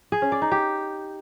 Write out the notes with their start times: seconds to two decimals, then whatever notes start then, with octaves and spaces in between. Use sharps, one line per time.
0.12 G#4
0.22 C#4
0.32 D5
0.42 D#4
0.52 G4